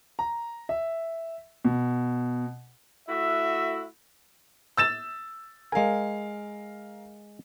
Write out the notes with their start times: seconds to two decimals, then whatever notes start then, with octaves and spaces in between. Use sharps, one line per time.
0.19 A#5
0.69 E5
1.65 B2
3.08 A3 E4 F#4 E5
4.77 E6 A6 E7
5.72 G#3 A#4 F5 G#5